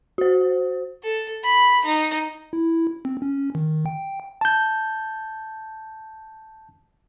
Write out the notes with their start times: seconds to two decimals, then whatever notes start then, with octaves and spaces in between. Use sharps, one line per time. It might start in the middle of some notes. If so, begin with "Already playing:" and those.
0.18 F#4 C5
1.03 A4
1.43 B5
1.85 D#4
2.53 E4
3.05 C4
3.22 C#4
3.55 D#3
3.86 G5
4.41 A5 G6